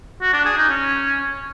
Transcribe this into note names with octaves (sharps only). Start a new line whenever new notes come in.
F#4
D4
G#4
D#4
C#4